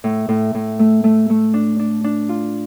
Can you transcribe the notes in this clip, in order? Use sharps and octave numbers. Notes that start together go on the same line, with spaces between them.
A2
A2
A2
A3
A3
A3
D4
D4
D4
F4